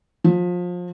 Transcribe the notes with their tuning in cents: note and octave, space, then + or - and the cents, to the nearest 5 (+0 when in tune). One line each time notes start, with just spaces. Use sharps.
F3 +25